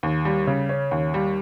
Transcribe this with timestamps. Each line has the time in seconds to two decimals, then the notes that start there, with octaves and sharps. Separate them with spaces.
0.03 D#2
0.25 G3
0.47 C#3
0.69 C#4
0.91 D#2
1.14 G3